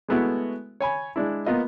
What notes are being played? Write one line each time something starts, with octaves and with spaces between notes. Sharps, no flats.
G#3 A3 B3 E4 F#4
C#5 G#5 B5
G#3 D4 E4
A#3 B3 F4 D#5